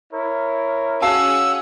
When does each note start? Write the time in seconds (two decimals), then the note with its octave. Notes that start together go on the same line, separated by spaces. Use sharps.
0.13 E4 A#4 C#5
1.02 C#4 F#4 G#4 F5 F#5 A5 E6